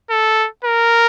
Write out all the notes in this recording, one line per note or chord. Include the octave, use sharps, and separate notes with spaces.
A4
A#4